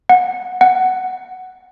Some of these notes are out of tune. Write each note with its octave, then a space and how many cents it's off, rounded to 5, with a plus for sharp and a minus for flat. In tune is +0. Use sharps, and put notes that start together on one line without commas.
F#5 -20
F#5 +5